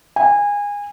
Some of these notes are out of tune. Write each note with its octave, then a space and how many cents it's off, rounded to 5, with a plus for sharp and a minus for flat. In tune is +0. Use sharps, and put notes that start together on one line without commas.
G#5 -25